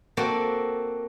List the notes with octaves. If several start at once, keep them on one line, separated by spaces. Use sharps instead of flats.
A#3 C4 F#4 A4 D5